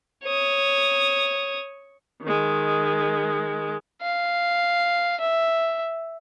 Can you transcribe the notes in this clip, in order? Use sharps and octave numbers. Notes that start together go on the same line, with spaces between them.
C#5 D#6
D#3 G#3
F5
E5